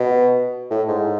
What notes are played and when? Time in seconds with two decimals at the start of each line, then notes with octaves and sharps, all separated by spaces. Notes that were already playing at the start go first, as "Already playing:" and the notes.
Already playing: B2
0.70 A2
0.88 G#2